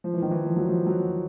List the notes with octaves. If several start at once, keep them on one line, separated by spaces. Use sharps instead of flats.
F3
E3
D#3
E3
F3
F#3
F3
F#3